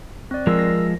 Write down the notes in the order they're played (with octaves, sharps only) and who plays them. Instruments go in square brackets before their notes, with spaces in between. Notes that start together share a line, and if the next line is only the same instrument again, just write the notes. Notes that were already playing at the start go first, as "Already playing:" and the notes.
[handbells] C4 D5
[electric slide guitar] F3 G#3 [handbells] A#4 E6
[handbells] A#6